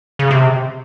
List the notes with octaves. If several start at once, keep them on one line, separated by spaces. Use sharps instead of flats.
C#3
C3